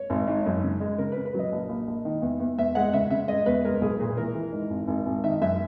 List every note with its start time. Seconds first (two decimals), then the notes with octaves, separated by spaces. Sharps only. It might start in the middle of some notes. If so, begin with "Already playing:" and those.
Already playing: C#5
0.10 G#1
0.27 G#2
0.46 F#2
0.63 C#3
0.80 G#3
0.98 C#3 A#4
1.12 B4
1.17 C#3
1.26 B4
1.34 F#3 D#5
1.52 A#1
1.69 A#1
1.87 A#1
2.05 D#3
2.22 E2
2.40 E2
2.58 E2 E5
2.75 G#3 F#5
2.93 C#3 E5
3.10 C#3 E5
3.28 G#3 D#5
3.46 E2 B4
3.64 G#3 A#4
3.81 B1 G#4
3.99 A#2 G#4
4.17 E3 A#4
4.35 E3
4.52 G#2
4.70 G#1
4.88 G#1
5.06 G#1
5.24 D#3 E5
5.41 F#2 E5